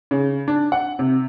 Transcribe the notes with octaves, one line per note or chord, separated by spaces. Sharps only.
C#3
D4
F#5
C3